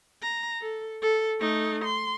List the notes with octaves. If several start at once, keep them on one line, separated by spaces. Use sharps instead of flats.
A#5
A4
A4
A3 D#4
C6